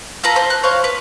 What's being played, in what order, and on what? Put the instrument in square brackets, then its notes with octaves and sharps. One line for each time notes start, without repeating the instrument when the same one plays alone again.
[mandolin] F4 A4 B4 A#5
C5
F#6
C5 C#5 F5
B4